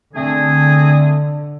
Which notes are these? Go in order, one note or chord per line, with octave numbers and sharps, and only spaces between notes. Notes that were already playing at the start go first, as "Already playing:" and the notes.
D3 A3 C4 G#4